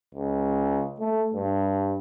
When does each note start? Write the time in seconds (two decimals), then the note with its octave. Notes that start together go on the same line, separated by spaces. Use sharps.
0.15 C#2
0.99 A3
1.34 G2